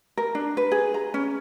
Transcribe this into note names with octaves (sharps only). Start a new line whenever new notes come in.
A#4
D4
B4
G#4
A#5
C#4